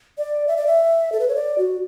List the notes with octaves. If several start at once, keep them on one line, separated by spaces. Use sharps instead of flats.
D5
E5
D5
E5
A4
B4
C#5
D5
F#4